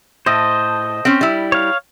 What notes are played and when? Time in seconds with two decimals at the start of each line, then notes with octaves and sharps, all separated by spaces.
0.26 A2 C5 D#5
1.05 C4 C#4
1.21 G3 E4
1.52 C#5 F5